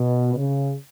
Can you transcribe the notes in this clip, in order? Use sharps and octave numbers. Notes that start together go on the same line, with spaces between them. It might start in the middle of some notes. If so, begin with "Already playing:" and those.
Already playing: B2
C#3